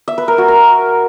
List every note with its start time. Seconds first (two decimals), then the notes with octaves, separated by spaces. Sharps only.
0.08 E5
0.18 B4
0.28 A#4
0.38 F#4
0.48 A#4